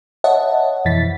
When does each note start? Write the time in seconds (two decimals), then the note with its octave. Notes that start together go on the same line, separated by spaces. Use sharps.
0.24 C#5 D#5 E5 F#5 A5
0.85 F2 B2 E3 A6 B6